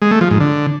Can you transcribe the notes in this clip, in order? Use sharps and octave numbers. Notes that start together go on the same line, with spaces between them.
G#3
A3
F3
G#2
D3